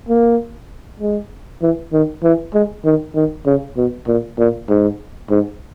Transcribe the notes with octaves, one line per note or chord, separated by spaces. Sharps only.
A#3
G#3
E3
D#3
E3
G#3
D#3
D#3
C#3
B2
A#2
A#2
G#2
G#2